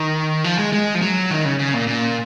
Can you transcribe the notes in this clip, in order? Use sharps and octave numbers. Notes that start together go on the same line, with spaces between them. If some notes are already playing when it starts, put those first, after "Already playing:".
Already playing: D#3
F3
G#3
G#3
F3
F#3
D#3
C#3
C#3
A#2
A#2